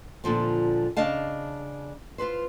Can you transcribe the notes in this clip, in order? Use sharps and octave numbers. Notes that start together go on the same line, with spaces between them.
A#2 D3 F3 C4
C#3 D4 D#5 F5 A5
F4 A4 B4 C5